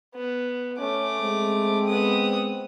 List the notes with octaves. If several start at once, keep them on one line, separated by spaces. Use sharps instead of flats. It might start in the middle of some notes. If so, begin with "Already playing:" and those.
B3
A3 C#4 D6
G#3 C4
B3 D#6